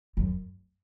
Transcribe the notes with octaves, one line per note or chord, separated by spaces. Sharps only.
F#2